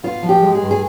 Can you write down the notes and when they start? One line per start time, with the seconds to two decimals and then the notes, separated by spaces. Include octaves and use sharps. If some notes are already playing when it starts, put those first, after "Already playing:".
0.03 B3 F4
0.22 F3
0.29 G4
0.42 G#3
0.55 G#4
0.61 G2
0.71 G#4